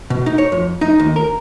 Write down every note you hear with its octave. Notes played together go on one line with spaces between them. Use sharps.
B2
D#4
C#5
F2
D#4
D#2
A#4